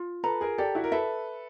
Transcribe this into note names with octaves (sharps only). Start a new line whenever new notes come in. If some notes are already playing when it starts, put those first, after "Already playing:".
Already playing: F4
A4 B4 A#5
G#4 A#4
G4 A4 D5
E4 F#4
A#4
A4 B4 E5